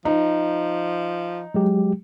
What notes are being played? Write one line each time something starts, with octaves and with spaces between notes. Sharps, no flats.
F3 D#4
F#3 G#3 G4